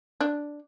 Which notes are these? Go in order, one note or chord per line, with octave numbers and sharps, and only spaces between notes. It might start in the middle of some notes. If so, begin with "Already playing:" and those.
D4